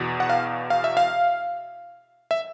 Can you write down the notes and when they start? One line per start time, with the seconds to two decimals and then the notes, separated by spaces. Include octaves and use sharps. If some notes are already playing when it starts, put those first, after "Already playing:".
Already playing: E2 B2
0.20 F#5
0.30 F5
0.70 F5
0.84 E5
0.97 F5
2.31 E5